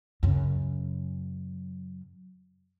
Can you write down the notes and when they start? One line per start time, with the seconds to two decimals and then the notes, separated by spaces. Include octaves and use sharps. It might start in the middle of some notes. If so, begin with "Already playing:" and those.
0.23 F#2 C#3